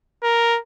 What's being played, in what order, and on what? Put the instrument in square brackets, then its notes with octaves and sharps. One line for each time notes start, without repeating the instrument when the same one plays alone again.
[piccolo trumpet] A#4